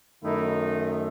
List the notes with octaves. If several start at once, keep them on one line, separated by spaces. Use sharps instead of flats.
F#2 D#3 A3 D#4 E4